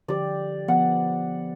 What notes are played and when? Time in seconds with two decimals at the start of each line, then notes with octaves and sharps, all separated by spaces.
0.08 D3 F3 G4 D5
0.68 F3 B3 F#5